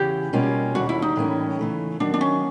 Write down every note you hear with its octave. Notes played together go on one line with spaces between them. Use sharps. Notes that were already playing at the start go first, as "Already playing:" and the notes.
Already playing: E2 C#3 E3 G4
B2 G3 A#3 C#4 F4
D#2 D3 G3 F#4
E4
D#4
A2 E3 G3 A#3 C#4
C#3 E3 A3
D#3 F#3 A#3 D4
D4
C#4